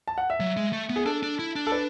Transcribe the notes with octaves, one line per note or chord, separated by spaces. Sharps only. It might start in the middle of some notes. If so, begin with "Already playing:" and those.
A5
F#5
E5
F#3
G#3
A3
B3
G#4
D4 A4
D4
E4
D4
A4
B4